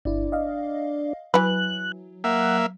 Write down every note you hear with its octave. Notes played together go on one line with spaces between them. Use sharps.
G1 D4 E4
D#5 F5
E3 F#3 B4 F#6
A#3 E5 F#5